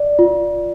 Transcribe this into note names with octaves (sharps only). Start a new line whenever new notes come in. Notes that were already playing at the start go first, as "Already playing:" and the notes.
Already playing: D5
F4